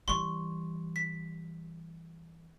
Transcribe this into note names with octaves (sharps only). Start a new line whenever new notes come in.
E3 G3 C6 C#6
B6